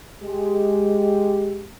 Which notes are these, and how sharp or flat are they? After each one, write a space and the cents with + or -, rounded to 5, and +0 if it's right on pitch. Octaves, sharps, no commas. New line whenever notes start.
G#3 +0 G4 +0